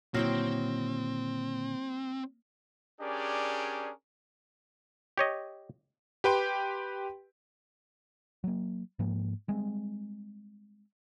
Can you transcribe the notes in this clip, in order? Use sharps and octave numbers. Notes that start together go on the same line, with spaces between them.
A#2 D3 D#3 F#3 A#3 C4 E4 G5
C#4 D4 G4 G#4 A#4 D5
G4 C#5 D#5
G4 B4 G5 C6
F#3 A#3
G#2 F3 A#3
G3 G#3 C4